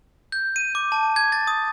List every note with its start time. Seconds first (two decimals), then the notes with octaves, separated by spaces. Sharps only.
0.32 G6
0.56 D#7
0.75 D6
0.92 A5
1.16 G#6
1.32 A6
1.47 D#6